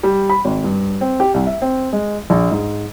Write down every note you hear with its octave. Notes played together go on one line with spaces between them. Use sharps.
G3
B5
G#1
G2
C4
G4
C2
E5
C4
G#3
A#1
G#2